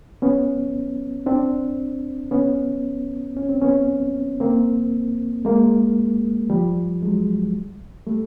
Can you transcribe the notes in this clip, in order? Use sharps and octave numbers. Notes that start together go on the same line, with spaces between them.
B3 C#4
C4 D4
B3 C#4
C#4
C4
B3 C#4
A#3 C4
G#3 A#3
F3 G3
F#3 G#3
G3 A3